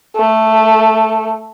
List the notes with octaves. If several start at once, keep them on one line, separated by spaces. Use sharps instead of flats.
A3